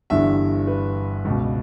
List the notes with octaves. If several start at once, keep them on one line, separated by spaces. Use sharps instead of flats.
G1 G2 E3 E5
B4
C#2 B2